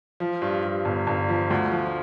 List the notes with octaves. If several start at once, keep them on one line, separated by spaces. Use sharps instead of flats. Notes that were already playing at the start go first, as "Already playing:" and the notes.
F3
G2
G2
G1
G1
F3
D2
F3